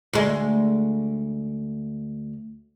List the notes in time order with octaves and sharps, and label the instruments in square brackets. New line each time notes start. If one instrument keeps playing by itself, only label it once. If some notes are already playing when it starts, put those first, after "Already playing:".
[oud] D2 G#3